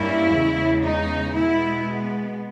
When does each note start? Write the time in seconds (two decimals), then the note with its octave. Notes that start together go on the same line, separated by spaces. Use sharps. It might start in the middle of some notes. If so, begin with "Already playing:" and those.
Already playing: G2 G3 A#3 C#4 E4
0.30 E2 C#3 G#3
0.83 D#4
1.34 B2 G#3 B3 E4